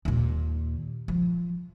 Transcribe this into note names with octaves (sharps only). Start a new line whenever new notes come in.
D#2 A#2
F3